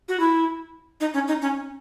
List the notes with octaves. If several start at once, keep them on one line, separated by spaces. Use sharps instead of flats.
F#4
E4
D#4
C#4
D#4
C#4